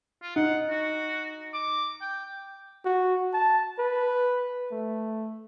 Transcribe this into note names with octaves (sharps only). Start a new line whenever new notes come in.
F4
D#4 F#5
F#4
D6
G5
F#4
A5
B4
A3